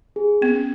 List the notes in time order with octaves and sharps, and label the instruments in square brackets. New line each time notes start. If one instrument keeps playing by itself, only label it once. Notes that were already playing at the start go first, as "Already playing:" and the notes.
[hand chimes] G#4
[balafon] B3 [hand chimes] C#4